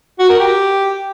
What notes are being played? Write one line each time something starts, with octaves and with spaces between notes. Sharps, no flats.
F#4
A#4
G4